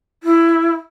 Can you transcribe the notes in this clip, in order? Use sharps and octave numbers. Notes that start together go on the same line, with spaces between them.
E4